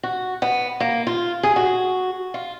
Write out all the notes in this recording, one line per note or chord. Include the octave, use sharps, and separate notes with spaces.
F#4
B3
A#3
F4
G#4
F#4
F4